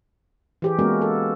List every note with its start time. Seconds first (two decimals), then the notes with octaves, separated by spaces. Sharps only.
0.62 E3 G4 G#4
0.79 G#3 A#3 B3 C#4 F#4 A#4
1.02 A4